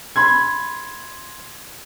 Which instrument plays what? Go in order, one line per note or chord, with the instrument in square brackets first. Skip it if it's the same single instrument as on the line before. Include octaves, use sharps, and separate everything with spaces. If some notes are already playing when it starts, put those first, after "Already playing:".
[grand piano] B5 C6 G#6